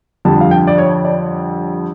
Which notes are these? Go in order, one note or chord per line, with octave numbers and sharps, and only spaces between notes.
F2 D3 G3 A5
F5
G5
D5
C#5
D5